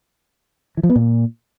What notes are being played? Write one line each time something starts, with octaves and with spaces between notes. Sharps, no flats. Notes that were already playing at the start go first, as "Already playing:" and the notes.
E3
F3
B3
A#2